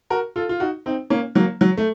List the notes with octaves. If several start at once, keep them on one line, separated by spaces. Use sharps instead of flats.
F#4 A#4
F4 A4
F4
D#4 F#4
C4 D#4
A#3 C#4
F#3 A#3
F#3
A3